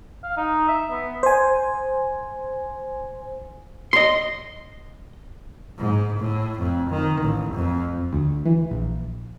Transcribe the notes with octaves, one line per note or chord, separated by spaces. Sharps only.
F5
D#4
E5
B3
C5 G#5
D#5 C6
G#2
A2
F2
D#3
A1
F2
D2
E3
A#1